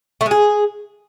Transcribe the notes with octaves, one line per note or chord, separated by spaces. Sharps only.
A3
G#3
G#4